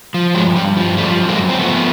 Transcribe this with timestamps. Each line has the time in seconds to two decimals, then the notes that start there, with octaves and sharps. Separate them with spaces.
0.14 F3
0.35 G2 F#3 G#3
0.56 G2 G3
0.76 F3
0.98 F3 G3 A3
1.19 F#2
1.29 G#3 A#3
1.40 F#2
1.49 C4
1.59 F3 A3 B3